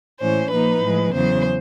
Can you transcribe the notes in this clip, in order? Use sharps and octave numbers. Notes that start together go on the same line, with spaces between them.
A2 E3 G#3 C#4 C5
A#2 F3 A#3 D#4 B4
A2 F3 G#3
E2 C#3 F#3 C5